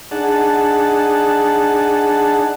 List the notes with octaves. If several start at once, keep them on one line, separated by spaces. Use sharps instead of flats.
D4 D#4 G#4 F#5 A5